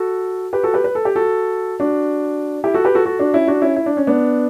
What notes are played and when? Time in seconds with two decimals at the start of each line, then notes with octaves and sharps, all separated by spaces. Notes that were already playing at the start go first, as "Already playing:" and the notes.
Already playing: F#4 A4
0.53 G4 B4
0.63 F#4 A4
0.74 G4 B4
0.84 B4
0.95 A4
1.05 G4
1.16 F#4 A4
1.80 D4 F#4
2.64 E4 G4
2.74 F#4 A4
2.85 G4 B4
2.95 F#4 A4
3.06 F#4 A4
3.19 D4 F#4
3.34 C#4 E4
3.48 D4 F#4
3.62 C#4 E4
3.76 E4
3.86 D4
3.97 C#4
4.07 B3 D4